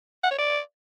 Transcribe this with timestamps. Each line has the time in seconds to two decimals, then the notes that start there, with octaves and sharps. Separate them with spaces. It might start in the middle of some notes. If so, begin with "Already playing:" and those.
0.23 F#5
0.31 C#5
0.38 D5